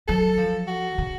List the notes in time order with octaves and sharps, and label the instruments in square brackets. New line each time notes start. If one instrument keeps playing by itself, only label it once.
[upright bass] F#3 [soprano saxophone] A4
[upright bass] F3
[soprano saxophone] F#4
[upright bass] C#3